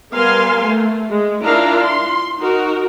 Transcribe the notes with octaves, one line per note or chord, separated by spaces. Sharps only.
G3 B3 A#4 F5 G#5 C6
A3
G#3
D4 E4 F4 A#4 F5 A#5
C6
D#4 F#4 A#4